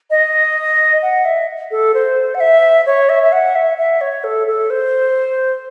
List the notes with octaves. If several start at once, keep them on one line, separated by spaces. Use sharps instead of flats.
D#5
F#5
E5
A4
C5
F#5
E5
C#5
E5
E5
F#5
E5
E5
C#5
A4
A4
C5